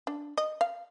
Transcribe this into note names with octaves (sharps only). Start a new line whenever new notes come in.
D4
D#5
F5